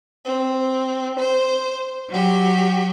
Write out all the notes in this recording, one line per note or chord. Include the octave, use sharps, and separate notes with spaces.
C4
C5
F#3 F#4 G4